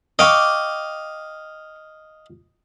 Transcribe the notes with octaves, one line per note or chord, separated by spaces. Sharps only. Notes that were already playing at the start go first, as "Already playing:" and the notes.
D#5 F5 G5 C#6 D6